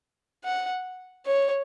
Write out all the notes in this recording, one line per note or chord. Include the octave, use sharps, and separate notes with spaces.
F#5
C#5